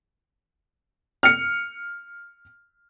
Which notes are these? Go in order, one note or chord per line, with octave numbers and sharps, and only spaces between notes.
F6 C#7